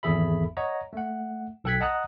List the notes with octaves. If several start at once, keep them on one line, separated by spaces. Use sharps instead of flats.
G#1 E2 G#4 A4 E5 B5
C#5 D#5 F#5 A#5
A3 F#5
B1 A4 G5 F#6 G#6 B6
D#5 F#5 A5 A#5 D#6 F#6